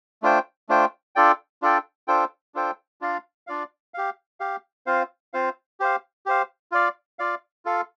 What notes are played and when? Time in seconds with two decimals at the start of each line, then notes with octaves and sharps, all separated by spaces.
0.22 A3 D4 F4 C5 G5
0.69 A3 D4 F4 C5 G5
1.16 D4 F4 A4 D5 G5
1.62 D4 F4 A4 D5 G5
2.08 D4 F4 A4 C5 G5
2.55 D4 F4 A4 C5 G5
3.01 D4 F4 D5 F5
3.47 D4 F4 D5 F5
3.94 G4 F5
4.40 G4 F5
4.86 C4 F4 C5 F5
5.33 C4 F4 C5 F5
5.80 G4 C5 F5
6.26 G4 C5 F5
6.72 F4 D5 F5
7.19 F4 D5 F5
7.65 F4 A4 F5